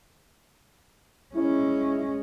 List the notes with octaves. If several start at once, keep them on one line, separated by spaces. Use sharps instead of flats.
G#3 C#4 E4